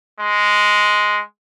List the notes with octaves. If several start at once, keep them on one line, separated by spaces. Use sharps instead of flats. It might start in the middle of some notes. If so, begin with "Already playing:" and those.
G#3